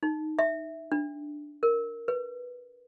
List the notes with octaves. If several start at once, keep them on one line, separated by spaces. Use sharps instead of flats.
D#4
E5
D4
A#4
B4